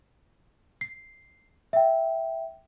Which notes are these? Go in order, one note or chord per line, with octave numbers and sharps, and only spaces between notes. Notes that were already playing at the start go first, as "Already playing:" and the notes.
C7
E5 G5